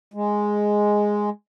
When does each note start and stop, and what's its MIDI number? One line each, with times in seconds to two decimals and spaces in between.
0.14 1.30 56